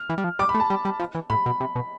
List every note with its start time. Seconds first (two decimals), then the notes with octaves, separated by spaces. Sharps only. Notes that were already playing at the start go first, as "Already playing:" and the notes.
Already playing: F6
0.09 E3
0.18 G3
0.24 F3
0.39 G3 D6
0.49 B5
0.54 A3
0.60 A5
0.70 G3
0.85 G3
1.00 F3
1.15 E3
1.30 A2 B5
1.46 B2
1.60 C3
1.75 B2